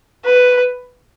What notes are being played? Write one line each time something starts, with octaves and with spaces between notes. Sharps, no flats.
B4